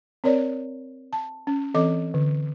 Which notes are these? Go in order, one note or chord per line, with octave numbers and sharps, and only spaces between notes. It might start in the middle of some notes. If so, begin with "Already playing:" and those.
C4 A#4 C#5 D5
A5
C#4
E3 C4 A4 D#5 D6
D3